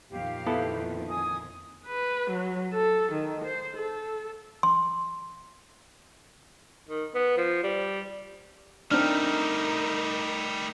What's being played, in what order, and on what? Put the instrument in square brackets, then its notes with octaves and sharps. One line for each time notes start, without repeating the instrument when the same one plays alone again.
[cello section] F2 A#2 D#3 [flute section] G4 F5
[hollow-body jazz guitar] B3 E4 A4
[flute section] G#5 D#6
[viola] B4
F#3
A4
D#3
C5
A4
[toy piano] C6
[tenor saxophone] D#3
B3
F3
G3
[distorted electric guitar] G3 A3 [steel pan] C4 D4 [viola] D#4 A#4 [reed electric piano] F6